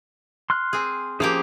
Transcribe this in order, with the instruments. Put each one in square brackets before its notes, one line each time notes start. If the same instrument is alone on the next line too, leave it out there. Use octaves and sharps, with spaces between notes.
[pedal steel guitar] C6 F6 F#6
[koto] C4 G#4
[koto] F3 A#3 G4 [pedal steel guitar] C#4 G#4 C5